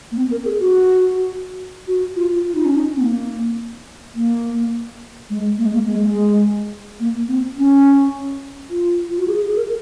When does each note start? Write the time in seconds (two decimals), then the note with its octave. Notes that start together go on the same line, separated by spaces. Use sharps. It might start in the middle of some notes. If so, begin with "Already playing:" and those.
0.12 A#3
0.17 C4
0.31 A#4
0.45 G#4
0.60 F#4
1.88 F#4
2.16 F4
2.44 F4
2.55 D#4
2.65 C#4
2.75 D#4
2.96 C4
3.02 A#3
4.15 A#3
5.30 G#3
5.58 A#3
5.66 G#3
5.74 A#3
5.86 G#3
6.04 G#3
7.00 A#3
7.28 C4
7.57 C#4
8.70 F4
9.10 F4
9.18 F#4
9.28 G#4
9.42 G#4
9.56 A#4